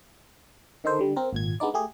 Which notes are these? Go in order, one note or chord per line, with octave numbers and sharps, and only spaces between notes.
D3 D#3 D#4 A4 C5
D3 G3
C4 A#4
G#1 A#2 G#6
G#3 B3 D4 D#4 D5
A3 G4 G#4